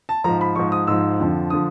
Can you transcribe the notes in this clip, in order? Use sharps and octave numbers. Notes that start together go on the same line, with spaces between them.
A5
G#2 F3 A#5
B5
G#2 F3 C#6
D#6
G#2 F3 E6
F2 D3 F3
D3 F3 D#6